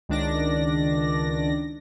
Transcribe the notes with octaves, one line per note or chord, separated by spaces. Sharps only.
C#2 D#3 D4 D5 A#6